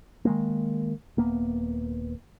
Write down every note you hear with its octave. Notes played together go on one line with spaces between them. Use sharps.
D#3 G#3 A#3
D#1 A#3 B3